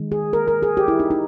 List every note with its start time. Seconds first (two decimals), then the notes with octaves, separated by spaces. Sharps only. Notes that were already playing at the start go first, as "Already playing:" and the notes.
Already playing: D#3 G#3
0.12 G#4
0.33 A#4
0.48 A#4
0.63 G#4
0.77 G4
0.88 E4
1.00 D#4
1.11 D#4